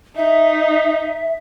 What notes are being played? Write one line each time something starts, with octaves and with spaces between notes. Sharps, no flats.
D#4 E5